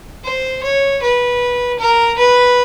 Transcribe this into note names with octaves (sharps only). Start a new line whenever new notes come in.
C5
C#5
B4
A#4
B4